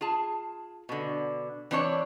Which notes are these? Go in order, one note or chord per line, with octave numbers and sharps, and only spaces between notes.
F4 G#4 A5
B2 D3
E3 C4 D4 C#5 D5